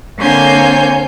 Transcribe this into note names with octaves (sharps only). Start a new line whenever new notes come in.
D3 A#3 C4 C#5 G#5 G6